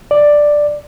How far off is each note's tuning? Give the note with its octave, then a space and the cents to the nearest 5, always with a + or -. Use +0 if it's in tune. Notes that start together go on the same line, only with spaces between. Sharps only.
D5 +5